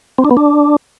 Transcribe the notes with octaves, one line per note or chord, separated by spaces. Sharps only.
C4
D4
B3
D4